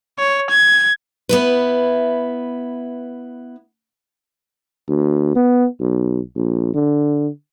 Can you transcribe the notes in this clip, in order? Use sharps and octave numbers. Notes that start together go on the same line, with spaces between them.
C#5
G#6
B3 E4 B4
D2
B3
B1
A#1
D3